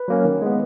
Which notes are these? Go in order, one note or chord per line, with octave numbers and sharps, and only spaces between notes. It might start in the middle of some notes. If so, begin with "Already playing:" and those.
Already playing: B4
F#3 A#3 C#4
D#3
G#3 B3